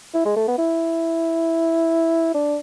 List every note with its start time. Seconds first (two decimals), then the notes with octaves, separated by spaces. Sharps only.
0.14 E4
0.25 G#3
0.36 A3
0.48 B3
0.58 E4
2.34 D4